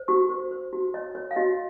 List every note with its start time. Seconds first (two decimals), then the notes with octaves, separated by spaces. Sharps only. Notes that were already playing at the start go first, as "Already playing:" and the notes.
Already playing: C5
0.08 F#4 C#6
0.30 C5
0.51 C5
0.73 F#4
0.94 C#5 D#5
1.15 C#5
1.31 F5
1.36 F#4 D#5